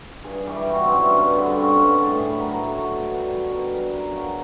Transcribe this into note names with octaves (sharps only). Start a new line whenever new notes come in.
G2 G#4
E3 G3 G4
G2 F#4
C4
E3 G3 C#4
G2 D4
B3
D3 G3 C4
G2 C#4
D3 G3 G4
A4
A2 G#4
F#3 B4
A#4
A2 A4
F#3
B2
G3
B2 A#4
G3 A#4
F#2 A#4
C#3 F#3 A#4